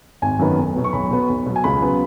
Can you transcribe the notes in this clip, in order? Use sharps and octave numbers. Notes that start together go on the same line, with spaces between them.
G#1 G#5
F#2 D#3 B3
B1
B2 F#3 B3
C#6
B1 B5
B2 B3
B1
B2 F#3
G#5
C#2 B5
C#3 F#3 B3